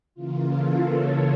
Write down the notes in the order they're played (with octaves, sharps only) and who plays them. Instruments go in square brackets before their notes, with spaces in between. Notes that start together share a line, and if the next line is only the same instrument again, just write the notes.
[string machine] C#3 E3 A#3 F4
A4
C#5